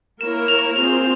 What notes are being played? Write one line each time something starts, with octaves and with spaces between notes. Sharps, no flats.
A#3 E4 A#4 C#5 E7
F7
C4 F4 G#4 C5 F7